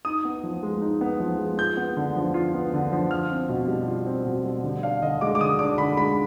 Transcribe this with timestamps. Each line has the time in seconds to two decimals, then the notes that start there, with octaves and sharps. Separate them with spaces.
0.05 D#4 D#6
0.25 B3
0.44 F3
0.63 G#3
0.82 D#4
1.01 B3
1.20 F3
1.39 G#3
1.58 F4 G6
1.77 B3
1.97 D3
2.16 F3
2.34 F4
2.54 B3
2.73 D3
2.92 F3
3.11 F4 F6
3.31 C4
3.49 B2
3.68 G3
3.88 F4
4.06 C4
4.26 B2
4.45 G3
4.64 D3
4.83 D4 F5
5.02 D3 D#5
5.21 G#3 D6
5.35 D6
5.41 D3 D#6
5.59 D4 D6
5.78 D3 B5
5.97 G#3 B5